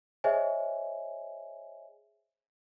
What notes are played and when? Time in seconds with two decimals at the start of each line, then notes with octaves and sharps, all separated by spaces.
0.24 G#4 C5 C#5 D#5 E5 G#5